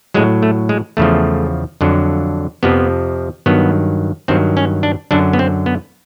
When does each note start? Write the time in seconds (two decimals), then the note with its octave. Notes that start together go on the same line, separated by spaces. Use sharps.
0.14 A2 F#3 G#3
0.42 A3
0.69 G#3
0.97 E2 C#3 F3 A3
1.81 F2 D3 F#3
2.63 F2 C3 F3 B3
3.46 G2 D#3 F#3 B3
4.28 G2 D#3 F#3 C4
4.57 C#4
4.83 D4
5.11 F#2 D3 F#3 D4
5.33 B3
5.39 C4
5.66 B3